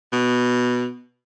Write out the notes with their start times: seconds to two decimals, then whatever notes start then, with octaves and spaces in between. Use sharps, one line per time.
0.12 B2